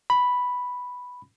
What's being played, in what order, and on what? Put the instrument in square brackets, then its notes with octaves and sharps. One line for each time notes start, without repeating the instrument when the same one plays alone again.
[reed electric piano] B5